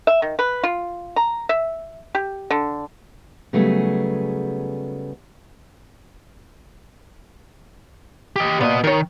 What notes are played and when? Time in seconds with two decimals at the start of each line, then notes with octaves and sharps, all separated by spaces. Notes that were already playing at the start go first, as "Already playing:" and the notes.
0.07 E5
0.22 D#3
0.39 B4
0.63 F4
1.16 A#5
1.49 E5
2.15 G4
2.51 D3
3.53 C#3 F#3 G3 A3 B3 G#4
8.36 G4 D#5
8.61 A#2 B3 D#5
8.84 D#3 A#4 C#5